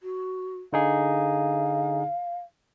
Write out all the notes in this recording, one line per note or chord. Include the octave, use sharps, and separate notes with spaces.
F#4
D3 D#4 G#4 F5